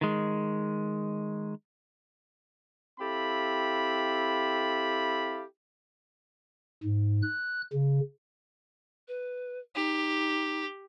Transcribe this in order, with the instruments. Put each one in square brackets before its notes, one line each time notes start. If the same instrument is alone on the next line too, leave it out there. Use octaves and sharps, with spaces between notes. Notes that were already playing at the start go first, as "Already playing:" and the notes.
[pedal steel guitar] D#3 G#3
[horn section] C4 E4 G4 A4 F5 B5
[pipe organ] G#2
F#6
C#3
[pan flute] B4
[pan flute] D#4 [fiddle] G4